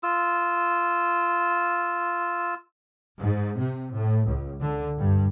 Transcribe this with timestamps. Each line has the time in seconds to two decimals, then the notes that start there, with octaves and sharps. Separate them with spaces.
0.03 F4 E6
3.19 G#2
3.58 C3
3.93 A2
4.26 C#2
4.60 D3
4.98 G2